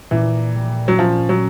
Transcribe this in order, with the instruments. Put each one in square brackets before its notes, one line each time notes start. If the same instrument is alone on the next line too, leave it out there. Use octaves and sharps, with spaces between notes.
[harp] A#2 [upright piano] E3
[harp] G3
[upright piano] F#3
[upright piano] F3 [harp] C#4
[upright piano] F#3